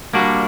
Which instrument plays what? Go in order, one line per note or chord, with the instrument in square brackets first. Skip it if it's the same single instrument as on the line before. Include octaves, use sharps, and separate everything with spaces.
[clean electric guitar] G3 A#3 D4 F#4